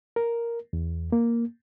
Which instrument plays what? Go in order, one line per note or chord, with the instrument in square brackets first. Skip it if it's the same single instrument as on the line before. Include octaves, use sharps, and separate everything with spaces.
[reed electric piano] A#4
E2
A#3